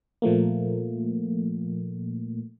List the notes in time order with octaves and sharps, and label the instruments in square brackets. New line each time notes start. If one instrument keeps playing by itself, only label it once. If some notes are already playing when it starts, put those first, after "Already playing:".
[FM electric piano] A#2 F3 A3 A#3